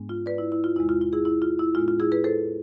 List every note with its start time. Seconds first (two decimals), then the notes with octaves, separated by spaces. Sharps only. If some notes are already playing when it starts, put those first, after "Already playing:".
Already playing: G#2 G#3 B3 D4
0.09 F4
0.26 B4 D5
0.38 E4
0.52 E4
0.64 F4
0.76 E2 C3 G#3 E4
0.89 F4
1.01 F4
1.13 E4 G#4
1.25 E4
1.42 F4
1.59 E4
1.75 A2 G#3 B3 D4 F4
1.88 F4
2.00 E4 G#4
2.12 G#4 B4
2.24 A4 C5